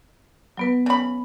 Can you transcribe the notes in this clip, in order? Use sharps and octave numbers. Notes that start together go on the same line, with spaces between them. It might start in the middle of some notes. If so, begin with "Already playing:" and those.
F#3 B3 B4
C#3 B5